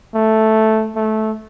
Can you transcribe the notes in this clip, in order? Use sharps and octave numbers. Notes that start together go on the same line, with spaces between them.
A3
A3